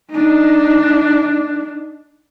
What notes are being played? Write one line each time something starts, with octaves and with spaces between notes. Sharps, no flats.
D4 D#4